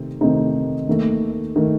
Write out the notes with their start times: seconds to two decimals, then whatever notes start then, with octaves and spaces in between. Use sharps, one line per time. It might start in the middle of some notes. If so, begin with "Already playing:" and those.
Already playing: C3 D#3 A3 C4
0.21 C3 D#3 A3 C4 D#4
0.87 D#2 D#3 A3
1.56 D#3 A3